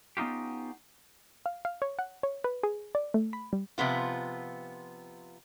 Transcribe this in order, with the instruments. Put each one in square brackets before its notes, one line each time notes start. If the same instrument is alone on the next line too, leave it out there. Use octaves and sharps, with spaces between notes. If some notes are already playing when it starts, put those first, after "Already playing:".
[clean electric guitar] B3 C#4 D#4 F4 G4
[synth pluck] F5
F5
C#5
F#5
C#5
B4
G#4
D5
A3
B5
G3
[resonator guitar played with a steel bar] C3 F3 B3 F4